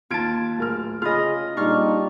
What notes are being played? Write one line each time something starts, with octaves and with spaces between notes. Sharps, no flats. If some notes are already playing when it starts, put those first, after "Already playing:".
D#2 F4 A5 G#6 D7
D1 A#4 F6
C#3 F4 G#4 D#5 B5 F6
A#2 G3 D4 D#4 F4 C#6 F6